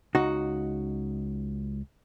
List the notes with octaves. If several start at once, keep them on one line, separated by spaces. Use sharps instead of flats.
C#2 D#4 F#4